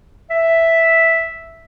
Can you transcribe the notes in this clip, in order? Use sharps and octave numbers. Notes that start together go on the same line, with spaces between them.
E5